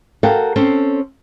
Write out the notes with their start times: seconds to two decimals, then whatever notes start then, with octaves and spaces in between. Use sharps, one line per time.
0.23 F#4 A4 A#4 F5 G5
0.56 C4 C#4 A4 C5